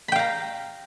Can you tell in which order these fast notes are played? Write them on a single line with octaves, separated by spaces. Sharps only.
B5 G5 F5 A#5